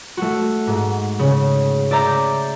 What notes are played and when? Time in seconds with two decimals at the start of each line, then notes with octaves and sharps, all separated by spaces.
0.17 A3 F#4
0.67 G#2
1.19 C#3
1.91 D5 E5 A#5 G6